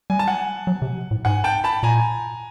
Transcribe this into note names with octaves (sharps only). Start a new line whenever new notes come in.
G3 G#5
A5
F#5 G#5
F#3
C3
A2
G#2 F#5 G#5
G5 A5
A5 B5
A#2 G#5 A#5